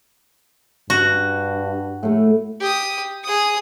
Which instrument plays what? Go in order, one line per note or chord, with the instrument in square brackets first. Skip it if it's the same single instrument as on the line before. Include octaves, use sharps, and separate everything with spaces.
[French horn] G2 [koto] F#4
[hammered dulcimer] A2 A3
[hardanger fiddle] G4 D#6
G#4 D#6